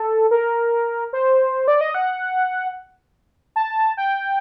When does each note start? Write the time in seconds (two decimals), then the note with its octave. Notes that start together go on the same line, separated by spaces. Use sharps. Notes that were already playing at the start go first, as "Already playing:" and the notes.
Already playing: A4
0.31 A#4
1.13 C5
1.68 D5
1.81 D#5
1.94 F#5
3.56 A5
3.97 G5